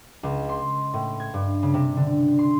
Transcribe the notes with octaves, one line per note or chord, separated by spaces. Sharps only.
C#2
C6
A2
G#6
G2
C#3
C3
D3
C6